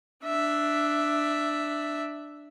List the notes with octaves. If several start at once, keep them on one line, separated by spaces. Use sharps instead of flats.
D4 E5